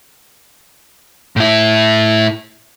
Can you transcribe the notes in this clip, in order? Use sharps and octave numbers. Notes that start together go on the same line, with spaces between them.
A2 E4